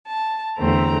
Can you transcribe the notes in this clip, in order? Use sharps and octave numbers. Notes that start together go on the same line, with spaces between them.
A5
E2 D3 A3 C4 A#5